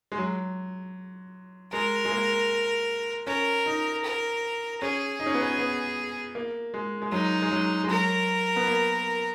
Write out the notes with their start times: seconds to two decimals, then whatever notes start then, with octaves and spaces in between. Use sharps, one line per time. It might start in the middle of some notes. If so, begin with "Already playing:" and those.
0.12 G#3
0.18 F#3
1.73 G#3 A#4
2.05 G#3
2.12 A#3
3.27 C#4 A#4
3.66 D#4
4.05 A#4
4.81 C#4 G#4
5.20 D#4
5.26 C#4
5.35 B3
5.41 C#4
5.59 B3
6.35 A#3
6.74 G#3
7.02 G#3
7.12 F#3 D#4
7.42 G#3
7.51 F#3
7.84 G#3
7.90 F#3 A#4
8.56 B3
8.67 A#3